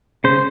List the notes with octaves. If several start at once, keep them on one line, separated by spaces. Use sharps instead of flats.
C#3 C5